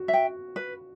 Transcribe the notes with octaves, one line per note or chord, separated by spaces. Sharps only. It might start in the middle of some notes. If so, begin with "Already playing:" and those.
Already playing: F#4
E5
G5
B4